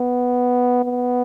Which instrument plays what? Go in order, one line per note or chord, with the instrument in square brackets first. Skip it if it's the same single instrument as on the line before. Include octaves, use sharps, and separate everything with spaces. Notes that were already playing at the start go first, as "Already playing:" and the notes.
Already playing: [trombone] B3
B3